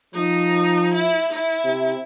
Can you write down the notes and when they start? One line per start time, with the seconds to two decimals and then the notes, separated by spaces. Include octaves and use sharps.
0.15 F3 D#4
0.94 E4
1.33 E4
1.64 C3